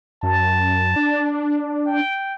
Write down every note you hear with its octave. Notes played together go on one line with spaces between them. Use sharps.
F#2 A5
D4
G5